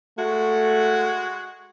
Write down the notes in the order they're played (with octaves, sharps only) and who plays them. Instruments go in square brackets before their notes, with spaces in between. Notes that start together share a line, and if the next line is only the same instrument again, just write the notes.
[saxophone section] G#3 F#4 [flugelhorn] A3